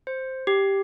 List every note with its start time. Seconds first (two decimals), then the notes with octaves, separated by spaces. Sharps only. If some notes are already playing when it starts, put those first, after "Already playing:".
0.07 C5
0.47 G4